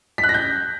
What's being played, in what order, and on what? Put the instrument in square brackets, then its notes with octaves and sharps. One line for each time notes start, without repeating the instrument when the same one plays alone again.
[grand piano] B6
F#6
A#6
G6